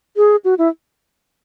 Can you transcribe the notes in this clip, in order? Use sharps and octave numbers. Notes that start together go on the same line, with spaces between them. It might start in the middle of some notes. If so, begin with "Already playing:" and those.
G#4
F#4
E4